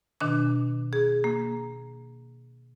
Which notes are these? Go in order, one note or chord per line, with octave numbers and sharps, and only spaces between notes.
B2 D#3 D4 D6
G#4
A#3